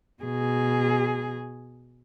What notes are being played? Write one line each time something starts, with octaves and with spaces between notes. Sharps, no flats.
B2 G#4